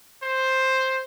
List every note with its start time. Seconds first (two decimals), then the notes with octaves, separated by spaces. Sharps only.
0.22 C5